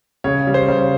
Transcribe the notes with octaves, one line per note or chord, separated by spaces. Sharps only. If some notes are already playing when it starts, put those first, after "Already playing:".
C#3 C#5
G3
C5
C#3